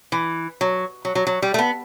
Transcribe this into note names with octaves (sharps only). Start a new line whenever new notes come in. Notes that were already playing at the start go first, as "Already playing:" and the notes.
E3
F#3
F#3
F#3
F#3
G3
A3
B3